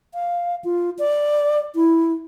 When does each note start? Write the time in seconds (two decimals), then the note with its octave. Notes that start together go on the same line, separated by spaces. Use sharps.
0.14 F5
0.65 F4
0.99 D5
1.75 E4